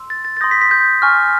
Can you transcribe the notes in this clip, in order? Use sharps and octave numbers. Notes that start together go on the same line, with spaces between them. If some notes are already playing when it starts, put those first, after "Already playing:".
Already playing: C6 E6
A6
A6
A6
C6 D#6 G6 A#6
B6
B6
G6
G#5 C#6 F6